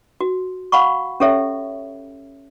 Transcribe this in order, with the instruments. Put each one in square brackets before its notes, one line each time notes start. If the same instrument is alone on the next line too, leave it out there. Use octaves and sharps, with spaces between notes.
[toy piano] F#4
F5 F#5 B5 C#6
C#4 G4 A4 C#5 E5